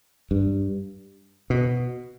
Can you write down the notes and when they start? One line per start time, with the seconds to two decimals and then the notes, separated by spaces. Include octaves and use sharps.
0.31 G2
1.50 B2